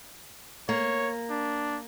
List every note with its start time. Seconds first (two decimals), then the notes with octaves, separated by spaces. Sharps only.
0.69 A#3 C#5
1.30 D4